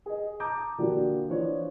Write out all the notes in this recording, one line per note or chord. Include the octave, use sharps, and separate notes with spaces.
G#4 D#5
A5 A#5 D6 D#6 G6
D3 F3 A#3 D4 F#4 G4
E3 F3 D4 C5 C#5